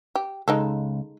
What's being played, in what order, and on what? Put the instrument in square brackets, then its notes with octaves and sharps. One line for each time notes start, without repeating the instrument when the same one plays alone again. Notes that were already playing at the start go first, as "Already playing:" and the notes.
[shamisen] G4
[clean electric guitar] C#2 [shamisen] G#3 D#4 A4